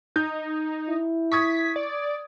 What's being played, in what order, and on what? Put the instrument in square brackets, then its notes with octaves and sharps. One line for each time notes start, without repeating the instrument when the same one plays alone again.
[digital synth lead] D#4 [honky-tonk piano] G6
[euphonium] E4
[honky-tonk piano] C#6 D#6 G#6 [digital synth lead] B6
[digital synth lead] D5